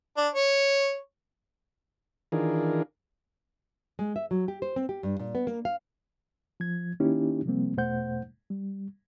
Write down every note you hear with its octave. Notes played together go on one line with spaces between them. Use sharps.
D4
C#5
D#3 E3 D4 F4 G#4 A#4
G#3
E5
F#3
G4
C5
C4
G4
G2
A#2
B3
A#3
F5
F3 G#6
D#3 A#3 C#4 D#4 E4 G4
C3 F3 G3 A#3 C4
E2 B2 A3 C5 F#5 G6
G3